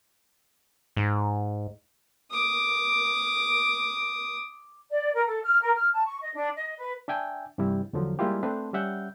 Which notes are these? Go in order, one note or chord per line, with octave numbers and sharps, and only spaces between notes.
G#2
D6 D#6
D5
A#4
A4
F6
A#4
F6
A5
C#6
D#5
D4
D#5
B4
D4 E5 G5 G#5
G2 C3 E3 G3 E4
E2 D3 F3 F#3
G3 G#3 A#3 E4 F4 G4
A3 C4 D4 B4 C5
G3 C#4 E5 F#5 G6